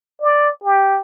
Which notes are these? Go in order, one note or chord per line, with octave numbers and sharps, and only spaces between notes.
D5
G4